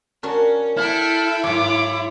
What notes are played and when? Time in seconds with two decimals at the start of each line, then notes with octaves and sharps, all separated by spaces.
0.23 C#4 D4 F#4 A#4
0.77 E4 A4 G5 F6
1.43 G#2 F#3 F4 C#5 D6